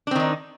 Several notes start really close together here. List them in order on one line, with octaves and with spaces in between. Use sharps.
D4 C4 D#3 D#4